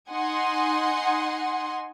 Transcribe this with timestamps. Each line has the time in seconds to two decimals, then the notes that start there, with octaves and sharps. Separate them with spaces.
0.11 D#4 F#5 G#5 C6